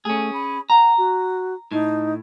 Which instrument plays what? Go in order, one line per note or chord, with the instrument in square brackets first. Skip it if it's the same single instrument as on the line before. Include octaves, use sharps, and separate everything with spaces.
[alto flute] A3 [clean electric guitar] C#4 G#4
[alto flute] B5
[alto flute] F#5 [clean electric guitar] A#5
[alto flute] F#4
[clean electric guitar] A2 [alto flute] D#4